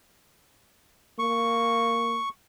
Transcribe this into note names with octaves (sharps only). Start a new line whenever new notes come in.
A#3 C#6